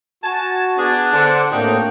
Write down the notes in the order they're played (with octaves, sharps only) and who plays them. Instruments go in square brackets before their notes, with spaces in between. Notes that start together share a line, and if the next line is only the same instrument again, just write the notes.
[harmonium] F#4 [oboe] G#5 [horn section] A5
[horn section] B3 G#4 [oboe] D4
[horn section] D3 [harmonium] C5 F#5 A5
[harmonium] A2 A#3 D4 [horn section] C3 D#4 F#4 [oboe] G5